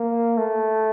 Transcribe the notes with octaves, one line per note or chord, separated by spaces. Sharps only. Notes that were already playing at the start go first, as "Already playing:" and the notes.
Already playing: A#3
A3